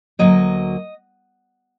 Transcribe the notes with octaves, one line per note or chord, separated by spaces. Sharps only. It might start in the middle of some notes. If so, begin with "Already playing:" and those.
D2 C3 F#3 A#3 D#5